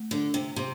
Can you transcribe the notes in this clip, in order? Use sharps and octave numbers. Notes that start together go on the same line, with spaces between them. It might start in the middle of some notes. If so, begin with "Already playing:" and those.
Already playing: A3
D3
C3
C3